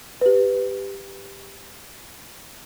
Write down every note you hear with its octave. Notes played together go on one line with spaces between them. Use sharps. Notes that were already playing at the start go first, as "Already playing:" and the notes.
G4 B4